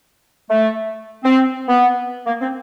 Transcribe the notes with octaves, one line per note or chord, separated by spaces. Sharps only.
A3
C4
B3
A#3
C4